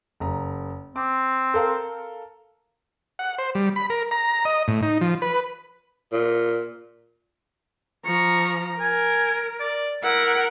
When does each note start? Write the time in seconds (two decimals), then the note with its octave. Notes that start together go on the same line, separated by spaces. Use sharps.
0.20 F#1 A#5
0.96 C4 D6
1.54 A4 A#4 F5
3.19 F#5
3.38 C5
3.55 G3
3.76 B5
3.90 A#4
4.11 A#5
4.45 D#5
4.68 A2
4.83 D#4
5.01 F3
5.22 B4
6.12 A#2
8.05 F3 A#5 C#6
8.80 A#4 G#5
9.60 D5
10.04 E4 A#4 F#5